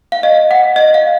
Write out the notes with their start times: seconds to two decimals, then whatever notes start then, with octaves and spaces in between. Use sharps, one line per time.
0.12 F5
0.23 D#5
0.51 F#5
0.76 D#5
0.94 F5